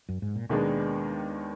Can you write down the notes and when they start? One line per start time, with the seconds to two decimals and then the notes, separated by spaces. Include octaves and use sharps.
0.09 F#2
0.22 G#2
0.36 A#2
0.49 D#2 B2 D#3 G#3 B3 D4